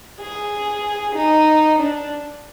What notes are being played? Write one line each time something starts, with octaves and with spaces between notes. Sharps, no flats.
G#4
D#4
D4